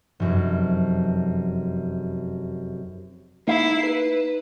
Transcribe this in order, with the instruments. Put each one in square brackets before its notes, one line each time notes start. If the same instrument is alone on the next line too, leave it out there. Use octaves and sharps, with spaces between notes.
[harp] F1 F#2
[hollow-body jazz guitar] A#3 F5 [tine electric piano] D#4 [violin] E4 C7
[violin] B4